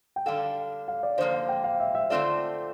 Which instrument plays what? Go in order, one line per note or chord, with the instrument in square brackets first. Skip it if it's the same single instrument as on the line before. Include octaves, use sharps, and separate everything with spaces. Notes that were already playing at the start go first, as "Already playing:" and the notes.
[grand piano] G5
[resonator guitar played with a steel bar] D3 G3 D4 A4 [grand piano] F5
[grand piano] F5
D5
[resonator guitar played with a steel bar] D3 F3 A#3 [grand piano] C5
[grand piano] F5
G5
F5
E5
E5
[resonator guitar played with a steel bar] D3 A3 C4 F4 A4 [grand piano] D5